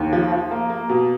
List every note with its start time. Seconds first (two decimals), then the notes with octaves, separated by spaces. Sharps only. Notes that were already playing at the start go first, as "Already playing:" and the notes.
Already playing: D#2
0.13 F3
0.32 F3
0.51 A#3
0.70 A#3
0.89 B2